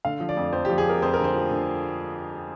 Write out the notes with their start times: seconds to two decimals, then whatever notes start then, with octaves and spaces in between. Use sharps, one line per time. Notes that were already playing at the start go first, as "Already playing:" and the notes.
0.05 D3 F5
0.20 F3
0.29 D5
0.37 F2
0.53 F2 C5
0.65 G4
0.70 F3
0.78 G#4
0.86 F2 A#4
1.02 F2 C5
1.14 A#4
1.19 D3
1.24 C5
1.34 F3
1.51 D3